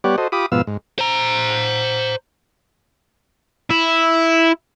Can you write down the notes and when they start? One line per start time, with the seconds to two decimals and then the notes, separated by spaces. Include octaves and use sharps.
0.04 G3 B3 G4 C#5 D5 F#5
0.18 F#4 A4 C5 D#5
0.32 F4 G4 B5 D6 D#6
0.52 G#2 B2 F3 B3 F5 E6
0.67 G#2
0.99 C5 A#5
3.70 E4